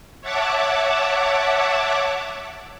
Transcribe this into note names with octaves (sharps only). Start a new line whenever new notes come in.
C#5 E5 F#5 A5 D6